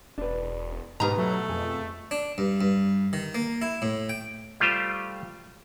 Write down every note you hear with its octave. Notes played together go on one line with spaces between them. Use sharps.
E1 D4 B4
G#2 B2 D#4 G4 B4 A#5
F#3 A3
F2 G#4
D4
G2
G2
D#3
A#3
E4
A2
G5
G3 A3 F4 G4 C5